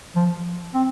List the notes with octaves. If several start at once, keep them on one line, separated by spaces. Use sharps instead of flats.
F3
C4